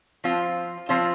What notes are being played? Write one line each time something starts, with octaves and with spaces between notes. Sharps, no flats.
F3 C4 F4
F3 C4 F4